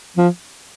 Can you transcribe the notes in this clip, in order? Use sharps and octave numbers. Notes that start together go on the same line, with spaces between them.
F3